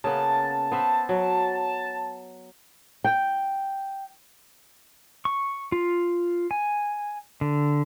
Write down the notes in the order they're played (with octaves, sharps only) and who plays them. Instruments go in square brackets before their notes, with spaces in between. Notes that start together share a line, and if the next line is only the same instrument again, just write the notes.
[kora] C#3 A#3 B3 [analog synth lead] A5
[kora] B3 C5 E5
F#3
[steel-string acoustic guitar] G5
[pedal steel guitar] C#6
F4
G#5
D3